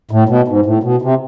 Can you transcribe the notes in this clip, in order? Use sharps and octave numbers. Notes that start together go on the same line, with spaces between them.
A2
B2
G#2
A2
B2
C3